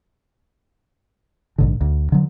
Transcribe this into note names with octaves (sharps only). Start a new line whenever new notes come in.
A#1 G#2 D3
D2
D3 F#3